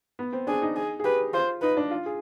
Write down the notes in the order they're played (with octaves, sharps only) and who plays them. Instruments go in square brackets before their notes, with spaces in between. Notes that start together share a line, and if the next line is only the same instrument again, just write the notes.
[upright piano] B3
C4
[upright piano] D4 [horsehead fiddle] G#4
[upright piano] D#4
[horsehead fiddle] G#4
[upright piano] G#4
[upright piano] G4 [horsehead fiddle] B4
[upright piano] F4 [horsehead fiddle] C5
[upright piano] D#4 [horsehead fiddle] B4
[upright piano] D4
F4
G#4